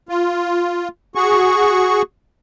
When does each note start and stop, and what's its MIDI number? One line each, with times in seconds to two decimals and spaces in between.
0.09 0.88 65
1.15 2.02 66
1.15 2.02 68
1.15 2.02 85